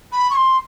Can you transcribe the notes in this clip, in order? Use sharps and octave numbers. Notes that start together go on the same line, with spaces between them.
B5
C#6
C6